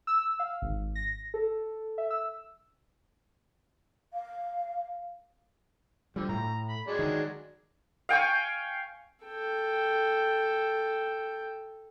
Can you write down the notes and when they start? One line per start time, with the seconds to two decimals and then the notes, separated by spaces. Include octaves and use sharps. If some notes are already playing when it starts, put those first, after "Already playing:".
0.07 E6
0.39 F5
0.62 G#1
0.95 A#6
1.34 A4
1.98 E5
2.10 E6
4.13 F5
6.16 D3 F3 G3
6.29 A2 A#5
6.69 B5
6.87 F#3 G#3 D4
6.99 D#3
8.09 F5 G5 G#5 C#6
9.24 A4 G5